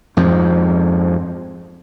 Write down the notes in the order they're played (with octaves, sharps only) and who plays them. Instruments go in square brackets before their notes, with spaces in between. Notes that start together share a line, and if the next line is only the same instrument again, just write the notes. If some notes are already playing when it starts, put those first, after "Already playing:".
[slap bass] F2 G#2 F3